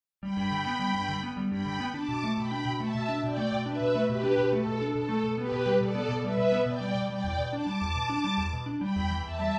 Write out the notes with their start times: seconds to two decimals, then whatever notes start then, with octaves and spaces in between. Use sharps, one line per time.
0.22 G3 G5 B5
0.37 G2
0.51 D3
0.66 B3
0.79 G3
0.94 G2
1.09 D3
1.23 B3
1.37 G3
1.51 G2 G5 B5
1.66 D3
1.80 B3
1.94 D4 A5 D6
2.09 B2
2.24 A3
2.37 B2 G5 B5
2.51 D4
2.65 B2
2.80 A3 E5 A5
2.95 B2
3.09 D4
3.23 B2 D5 G5
3.37 A3
3.52 B2
3.66 D4 B4 E5
3.81 B2
3.95 A3
4.08 B2 G4 B4
4.23 D4
4.38 B2
4.52 A3 A4
4.67 B2
4.81 D4
4.94 B2 A4
5.09 A3
5.24 B2
5.37 B3 G4 B4
5.52 B2
5.66 G3
5.80 B2 A4 D5
5.95 B3
6.09 B2
6.24 G3 B4 E5
6.37 B2
6.52 B3
6.66 B2 D5 G5
6.80 G3
6.95 B2
7.10 G3 D5 G5
7.24 E2
7.37 B2
7.52 D4 A5 D6
7.66 G3
7.81 E2
7.95 B2
8.09 D4
8.24 G3
8.38 E2
8.53 B2
8.66 D4
8.81 G3 G5 B5
8.96 E2
9.10 E3
9.23 E2 E5 A5
9.39 G3